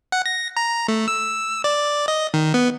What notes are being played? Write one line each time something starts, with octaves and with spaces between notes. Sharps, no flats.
F#5
A#6
A#5
A3
E6
D5
D#5
D#3
B3